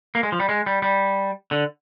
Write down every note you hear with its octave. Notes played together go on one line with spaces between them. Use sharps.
A#3
G#3
F3
G3
G#3
G3
G3
D3